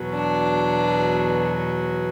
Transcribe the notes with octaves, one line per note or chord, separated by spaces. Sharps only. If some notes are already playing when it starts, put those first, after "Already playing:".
Already playing: E2 B2 F#3
D4